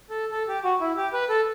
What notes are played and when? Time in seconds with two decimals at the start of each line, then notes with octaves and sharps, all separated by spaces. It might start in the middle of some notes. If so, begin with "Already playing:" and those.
0.10 A4
0.31 A4
0.48 G4
0.64 F#4
0.80 E4
0.97 G4
1.13 B4
1.29 A4